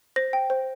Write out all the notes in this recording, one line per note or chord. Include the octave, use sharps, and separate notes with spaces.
C5 A#6
G5
C5